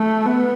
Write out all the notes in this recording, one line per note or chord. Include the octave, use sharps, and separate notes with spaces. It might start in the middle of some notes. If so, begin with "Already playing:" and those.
Already playing: A3
B3